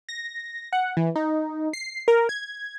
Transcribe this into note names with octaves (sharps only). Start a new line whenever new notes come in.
A#6
F#5
E3
D#4
C7
A#4
G#6